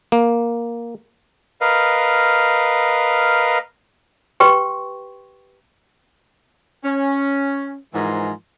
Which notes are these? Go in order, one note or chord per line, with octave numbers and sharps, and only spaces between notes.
A#3
A#4 B4 D#5 F5
G4 B4 G5 C6 C#6
C#4
G#2 E3 F3 A#4 G#5 C6